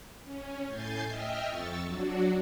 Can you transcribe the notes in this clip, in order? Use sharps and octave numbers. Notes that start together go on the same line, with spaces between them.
C#4
A2 G#5 G6 A6 C7
D#5 E5 G5 F6
F2 C#6 E6 A6
F#3 D4 F#4